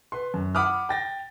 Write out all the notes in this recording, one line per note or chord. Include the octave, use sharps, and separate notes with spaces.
B4 C6
F#2
F#5 B5 D6 D#6 F6
G5 A6 A#6